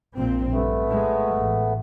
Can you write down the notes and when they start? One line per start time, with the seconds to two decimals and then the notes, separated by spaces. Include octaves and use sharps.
0.15 A#1 A#2 C4
0.52 G2 A3 B3
0.85 A2 G#3
1.36 A1